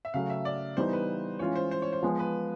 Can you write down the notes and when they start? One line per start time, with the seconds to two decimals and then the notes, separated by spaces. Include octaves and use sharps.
0.05 E5
0.14 C#3 F#3 A3 F5
0.30 E5
0.45 D5
0.77 E3 G3 B3 D#4 C5
0.93 B4
1.39 E3 G#3 C#4 F4 C#5
1.56 C5
1.71 C5
1.82 C#5
1.93 C5
2.03 F3 G#3 B3
2.19 B4